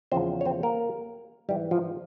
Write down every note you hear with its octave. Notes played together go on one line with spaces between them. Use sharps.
E2 C#3 F3 C4 C5
C#5
C4 C5
A#3 A#4
G#2 E3 G3 G4
F3 F4